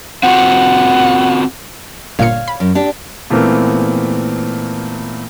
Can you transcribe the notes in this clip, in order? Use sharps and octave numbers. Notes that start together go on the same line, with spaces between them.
C4 F4 F#4 F#5
G1 A#2 C#5 F5 C#7
B5
F#2
D4 G4
A#2 E3 A3 B3 C4 A#4